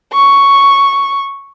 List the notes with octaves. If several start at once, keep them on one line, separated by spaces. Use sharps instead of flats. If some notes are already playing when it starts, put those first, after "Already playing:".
C#6